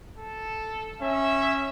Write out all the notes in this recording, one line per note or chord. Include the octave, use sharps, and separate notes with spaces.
A4
C#4 E5